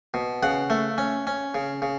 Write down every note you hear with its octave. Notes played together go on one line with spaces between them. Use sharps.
B2
C#3 F#5
A3
C#4
C#4
C#3
C#3